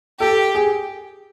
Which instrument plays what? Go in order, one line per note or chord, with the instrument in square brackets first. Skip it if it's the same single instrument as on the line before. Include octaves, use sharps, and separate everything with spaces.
[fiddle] G4 [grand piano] A4
[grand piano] G#4